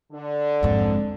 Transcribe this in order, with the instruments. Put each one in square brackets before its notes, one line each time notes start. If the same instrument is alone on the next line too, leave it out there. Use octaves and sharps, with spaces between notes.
[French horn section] D3
[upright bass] F2 G#2